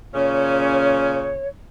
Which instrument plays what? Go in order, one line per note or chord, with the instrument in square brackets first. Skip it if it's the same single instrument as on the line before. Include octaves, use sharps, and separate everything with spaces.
[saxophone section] A#2 C#3 C#4 [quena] C#5